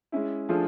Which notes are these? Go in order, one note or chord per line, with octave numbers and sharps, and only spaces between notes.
G#3 C#4 E4
F3 A3 D4 F4 G#4